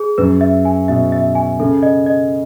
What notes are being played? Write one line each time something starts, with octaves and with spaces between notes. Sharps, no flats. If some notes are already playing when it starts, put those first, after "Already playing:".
Already playing: G#4
F#2 B4
E5
G#5
B2 E5
E5
G#5
C#3 A4
D#5
D#5